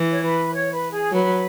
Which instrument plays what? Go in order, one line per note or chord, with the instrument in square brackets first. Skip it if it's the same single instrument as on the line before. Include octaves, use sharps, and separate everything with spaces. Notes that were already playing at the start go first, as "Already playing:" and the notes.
Already playing: [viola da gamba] E3
[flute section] C#5
B4
C#5
B4
G#4
[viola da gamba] F#3 [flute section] B4